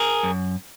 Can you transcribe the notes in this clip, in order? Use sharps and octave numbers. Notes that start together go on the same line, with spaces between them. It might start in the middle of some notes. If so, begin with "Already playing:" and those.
Already playing: G#4 A#4
F#2